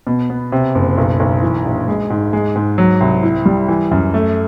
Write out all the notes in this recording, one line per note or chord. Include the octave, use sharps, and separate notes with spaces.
B2
B3
C3
F#1
B1
B1
E3
A#1
G#3
G#2
G#3
G#2
F#3
C2
E4
G3
E3
F#2
A3